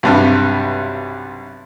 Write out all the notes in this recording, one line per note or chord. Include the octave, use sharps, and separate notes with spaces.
B1 G2 C3